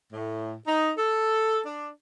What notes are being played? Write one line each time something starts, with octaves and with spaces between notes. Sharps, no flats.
A2
D#4
A4
D4